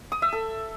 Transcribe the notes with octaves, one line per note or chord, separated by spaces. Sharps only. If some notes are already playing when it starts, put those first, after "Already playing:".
D#6
E5
A4